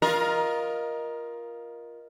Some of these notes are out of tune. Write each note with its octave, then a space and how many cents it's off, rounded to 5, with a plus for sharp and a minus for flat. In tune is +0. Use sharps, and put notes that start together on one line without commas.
F4 +0 A#4 +20 D#5 +0